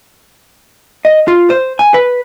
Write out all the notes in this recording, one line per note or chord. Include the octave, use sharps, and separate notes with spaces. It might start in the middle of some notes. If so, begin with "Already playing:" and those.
D#5
F4
C5
G#5
B4